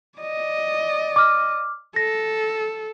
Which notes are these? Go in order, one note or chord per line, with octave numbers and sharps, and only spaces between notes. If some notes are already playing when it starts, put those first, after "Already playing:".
D5 D#5
D6 F6
A4 A#6